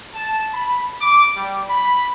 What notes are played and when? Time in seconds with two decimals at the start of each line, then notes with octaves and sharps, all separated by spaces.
0.13 A5
0.53 B5
1.01 D6
1.36 G3
1.69 B5